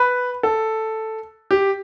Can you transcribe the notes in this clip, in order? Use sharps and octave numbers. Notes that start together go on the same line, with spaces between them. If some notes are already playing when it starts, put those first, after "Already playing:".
Already playing: B4
A4
G4